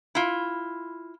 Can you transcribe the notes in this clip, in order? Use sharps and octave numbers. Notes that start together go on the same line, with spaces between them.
E4 F4